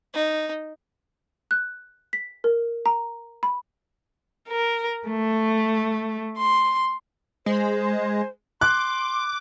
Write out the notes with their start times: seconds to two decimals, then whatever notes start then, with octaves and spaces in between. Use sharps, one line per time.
0.14 D#4
1.51 F#6
2.13 B6
2.44 A#4
2.86 A#5
3.43 B5
4.49 A#4
5.08 A3
6.37 C6
7.46 G#3 C5
8.61 C6 D6 F#6